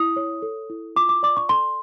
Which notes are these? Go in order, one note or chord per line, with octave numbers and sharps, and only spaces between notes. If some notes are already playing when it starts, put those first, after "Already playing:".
Already playing: E4 D#6
C#5
A4
E4
F4 D6
D6
D5 D6
C#6
A4 C6